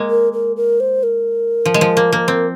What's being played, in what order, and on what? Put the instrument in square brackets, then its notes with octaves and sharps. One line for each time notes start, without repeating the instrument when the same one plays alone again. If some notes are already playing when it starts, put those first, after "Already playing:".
Already playing: [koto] G#3 A#3
[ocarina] A#4
A#4
A#4
C5
A#4
[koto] F3
G#3
F3
A#3
A#3
C4